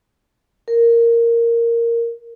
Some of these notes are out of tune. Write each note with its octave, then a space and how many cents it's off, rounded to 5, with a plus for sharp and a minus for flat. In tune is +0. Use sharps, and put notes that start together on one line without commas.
A#4 -5